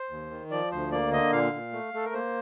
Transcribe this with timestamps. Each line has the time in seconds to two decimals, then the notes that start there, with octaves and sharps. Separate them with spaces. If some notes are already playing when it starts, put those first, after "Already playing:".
Already playing: C5
0.10 D#2
0.31 D#3
0.51 F3 D5
0.71 D2 C5
0.92 A#3 D5
1.12 D3 D#5
1.32 A#2 F5
1.53 A#2
1.73 A3
1.94 A3 A4
2.05 A#4
2.14 A#3 C5